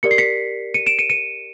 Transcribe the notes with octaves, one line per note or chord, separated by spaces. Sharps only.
G4 A#4 D5 C#7
C7
B6 C#7
C#7 D#7
D7 E7
C#7 D#7
C#7 D#7